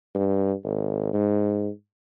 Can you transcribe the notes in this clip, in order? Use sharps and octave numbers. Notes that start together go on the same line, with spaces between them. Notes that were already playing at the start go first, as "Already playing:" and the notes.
G2
G#1
G#2